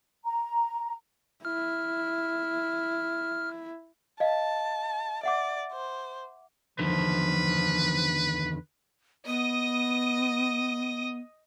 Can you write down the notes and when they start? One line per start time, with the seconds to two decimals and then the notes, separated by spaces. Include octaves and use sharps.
0.25 A#5
1.45 E4 F6
4.20 D#5 F5 A5
5.23 D5 E5 F#5 D6
5.73 C5
6.79 E2 D3 D#3 F3 B4
9.26 B3 D#5 D#6